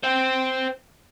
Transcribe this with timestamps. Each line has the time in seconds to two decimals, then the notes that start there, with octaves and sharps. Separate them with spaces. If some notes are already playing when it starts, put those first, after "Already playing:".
0.04 C5 G5